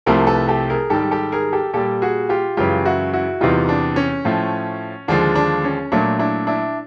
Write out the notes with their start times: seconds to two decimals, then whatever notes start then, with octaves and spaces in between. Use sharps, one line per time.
0.06 C2 C3 F3 A3 A#4 C5
0.27 A4 B4
0.48 G4 A4
0.70 G#4 A#4
0.90 G#2 D#3 G3 G4 A4
1.11 G4 A4
1.32 G#4 A#4
1.53 G4 A4
1.73 A#2 G3 G4 A4
2.02 F#4 G#4
2.29 F4 G4
2.57 F#2 C#3 E3 G#3 F4 G4
2.86 E4 F#4
3.13 E4 F#4
3.41 E2 C3 E3 G3 D#4 F4
3.69 D4
3.96 C#4
4.25 A2 F3 A3
5.08 D#2 D3 F3 G#3 D4
5.35 D4
5.64 C#4
5.92 A#2 F#3 A3 D4
6.19 D4 E4
6.47 D4 E4